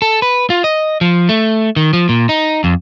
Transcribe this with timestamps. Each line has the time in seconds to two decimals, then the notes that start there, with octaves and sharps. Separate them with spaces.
0.02 A4
0.22 B4
0.50 F4
0.64 D#5
1.01 F3
1.29 A3
1.76 D#3
1.93 F3
2.09 A#2
2.29 D#4
2.64 F2